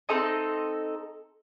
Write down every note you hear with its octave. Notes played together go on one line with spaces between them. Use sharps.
C4 D#4 A4 D#5